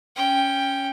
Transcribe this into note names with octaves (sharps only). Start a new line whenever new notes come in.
C#4 G5